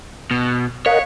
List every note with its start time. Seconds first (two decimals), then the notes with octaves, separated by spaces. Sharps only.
0.31 B2
0.86 A#4 C#5 D#5 F5 F#5